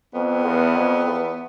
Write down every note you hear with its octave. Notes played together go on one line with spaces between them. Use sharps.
F2 B3
E2
F2
E2